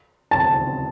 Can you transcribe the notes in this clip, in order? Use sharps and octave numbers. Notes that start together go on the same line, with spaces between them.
A5